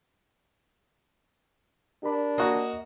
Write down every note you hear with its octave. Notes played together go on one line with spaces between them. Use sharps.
D4 G4 A#4 B5
A#3 F#4 D#5